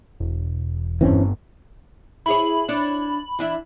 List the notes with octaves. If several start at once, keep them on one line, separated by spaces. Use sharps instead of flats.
E1
G1 E3 C4 C#4
E4 G#4 C#5 B5
D4 C#5 D5
E3 D4 E4